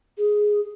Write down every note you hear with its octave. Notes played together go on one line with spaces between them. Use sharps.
G#4